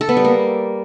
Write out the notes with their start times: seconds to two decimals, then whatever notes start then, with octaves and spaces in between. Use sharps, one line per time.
0.01 A4
0.09 B3
0.17 G3
0.25 A#3